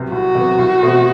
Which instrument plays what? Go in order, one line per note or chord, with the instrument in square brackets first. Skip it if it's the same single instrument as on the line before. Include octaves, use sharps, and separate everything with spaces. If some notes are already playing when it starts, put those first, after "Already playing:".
Already playing: [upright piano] C2 C3 F#3 B3
[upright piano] C2 [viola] F#4
[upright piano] C3 F#3 B3
C2
B2 A3 C4